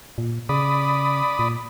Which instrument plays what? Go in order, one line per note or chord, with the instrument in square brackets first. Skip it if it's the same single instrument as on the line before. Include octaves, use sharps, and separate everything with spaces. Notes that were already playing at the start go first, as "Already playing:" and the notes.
[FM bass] A#2
[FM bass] C#3 [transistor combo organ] D5 B5 D#6
[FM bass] A#2